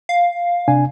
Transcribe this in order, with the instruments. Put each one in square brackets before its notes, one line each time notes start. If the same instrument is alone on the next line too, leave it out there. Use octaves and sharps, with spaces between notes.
[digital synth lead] F5
[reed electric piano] C3 D4 G#5